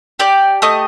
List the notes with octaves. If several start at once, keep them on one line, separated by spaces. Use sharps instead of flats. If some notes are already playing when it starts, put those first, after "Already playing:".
G4 D5
A3 D#5